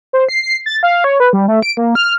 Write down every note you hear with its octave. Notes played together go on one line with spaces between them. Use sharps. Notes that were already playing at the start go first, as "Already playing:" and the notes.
C5
C7
C7
A6
F5
C#5
B4
G3
A3
D7
A#3
F6